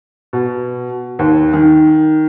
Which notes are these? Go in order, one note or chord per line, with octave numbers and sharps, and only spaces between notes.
B2
D#2
D#3